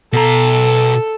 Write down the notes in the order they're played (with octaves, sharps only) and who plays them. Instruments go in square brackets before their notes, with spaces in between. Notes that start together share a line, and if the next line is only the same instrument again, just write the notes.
[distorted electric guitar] B2 A#5 [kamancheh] A4